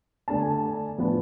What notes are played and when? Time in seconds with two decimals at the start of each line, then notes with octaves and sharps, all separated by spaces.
0.28 D3 A3 D4 A5
0.40 G#5
0.50 A5
0.98 A2 F3 B3 D4